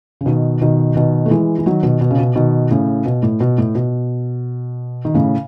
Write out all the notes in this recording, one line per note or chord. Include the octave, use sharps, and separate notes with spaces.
C#3
B2 D#3
B2 D#3
B2 D#3
A3
E3 G#3
E3
D#3 F#3
B2 D#3
B2
C#3
B2
B2 D#3
A2 C#3
B2
A2
B2
A2
B2
D#3
A2 C#3